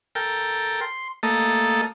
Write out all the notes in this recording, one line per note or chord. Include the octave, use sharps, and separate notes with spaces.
A4 A#4 G5
C6
A3 A#3 A4 D#5